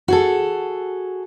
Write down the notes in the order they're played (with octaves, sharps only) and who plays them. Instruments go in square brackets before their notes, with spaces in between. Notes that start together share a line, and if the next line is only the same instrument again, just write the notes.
[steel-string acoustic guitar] F#4 G#4 A4